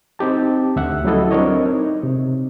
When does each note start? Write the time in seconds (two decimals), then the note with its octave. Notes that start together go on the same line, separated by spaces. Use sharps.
0.19 C4 D#4 G4 A5
0.76 D2 E5 F#5
1.05 F#3 G3 C#4 E4 A4 D#5
1.31 C4 D4 A#4 C#5 D#5
1.65 D#4
2.03 C3